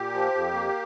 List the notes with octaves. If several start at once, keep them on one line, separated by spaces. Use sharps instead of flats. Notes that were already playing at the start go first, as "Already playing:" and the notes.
Already playing: A#2 G4
F3
F2
A#3